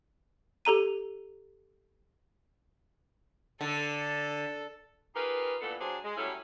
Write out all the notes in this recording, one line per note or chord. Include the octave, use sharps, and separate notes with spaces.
G4 A4 A#5 D#7
D3 A4
D#4 F4 G4 G#4 A#4 B4
A#2 E3 B3 D4 A4
F#3 D4 G4 G#4 C5
G#3
F#3 G3 A3 C#4 E4 A4